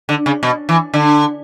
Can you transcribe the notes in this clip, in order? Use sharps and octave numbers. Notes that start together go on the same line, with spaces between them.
D3
C#3
B2
E3
D3